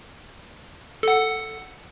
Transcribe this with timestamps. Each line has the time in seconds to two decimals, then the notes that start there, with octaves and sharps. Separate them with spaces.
1.03 A4 F#5